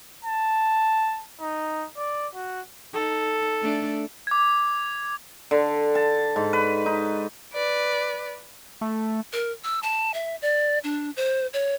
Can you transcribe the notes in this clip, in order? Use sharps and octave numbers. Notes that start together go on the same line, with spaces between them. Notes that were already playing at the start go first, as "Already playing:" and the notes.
A5
D#4
D5
F#4
D#4 A4
A3 D4
D6 G#6
D3
A5
G#2
B4
D#4
B4 D5
A3
A#4
E6
A5
E5
D5
D4
C5
C#5